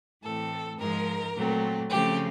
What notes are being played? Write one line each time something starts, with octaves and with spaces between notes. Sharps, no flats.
A2 E3 A3 C4 A4
G#2 F3 G#3 A#4
A#2 F#3 A3 C4
C#3 F3 A3 C4 G4